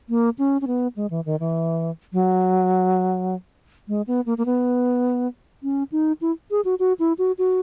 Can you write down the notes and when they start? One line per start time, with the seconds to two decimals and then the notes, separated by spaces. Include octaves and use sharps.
0.09 A#3
0.38 C#4
0.61 C#4
0.67 B3
0.96 G#3
1.10 E3
1.26 D#3
1.40 E3
2.13 F#3
3.88 G#3
4.07 B3
4.26 A#3
4.38 A#3
4.46 B3
5.63 C#4
5.92 D#4
6.21 E4
6.51 G#4
6.65 F#4
6.79 F#4
6.99 E4
7.18 F#4
7.38 F#4